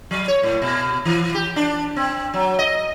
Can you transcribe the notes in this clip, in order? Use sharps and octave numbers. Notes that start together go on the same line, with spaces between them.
F#3
C#5
A2
B2
E3
G4
D4
C4
F#3
D#5